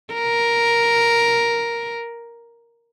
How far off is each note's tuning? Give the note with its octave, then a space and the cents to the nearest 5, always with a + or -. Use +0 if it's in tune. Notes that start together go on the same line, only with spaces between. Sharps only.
A#4 +5